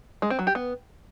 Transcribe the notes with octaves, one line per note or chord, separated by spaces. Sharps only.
G#3
C4
F#3
G4
B3